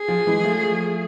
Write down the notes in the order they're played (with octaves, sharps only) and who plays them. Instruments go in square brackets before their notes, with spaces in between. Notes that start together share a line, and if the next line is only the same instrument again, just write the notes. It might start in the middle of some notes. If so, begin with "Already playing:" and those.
Already playing: [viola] G#4
[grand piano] F3
E3 G#3
F3 A3